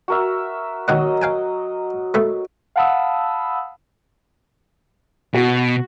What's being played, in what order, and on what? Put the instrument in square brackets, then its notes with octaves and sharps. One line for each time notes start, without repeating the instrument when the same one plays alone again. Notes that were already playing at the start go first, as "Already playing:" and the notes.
[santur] F#4 A#4 E5
[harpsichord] D#3 A#3 F#5 [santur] F#3 D#5
[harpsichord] F5 G5 G#5
A3 B3 E5
[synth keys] F5 F#5 A5 B5 D#6 E6
[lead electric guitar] B2 [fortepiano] F#4